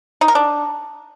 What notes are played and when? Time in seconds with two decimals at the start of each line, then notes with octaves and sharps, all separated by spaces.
0.21 D#4
0.28 A#4
0.35 D4